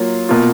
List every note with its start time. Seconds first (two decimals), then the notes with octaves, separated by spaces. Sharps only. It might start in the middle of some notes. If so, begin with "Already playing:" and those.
Already playing: F#3 A#3 F4
0.29 B2 A#3 F4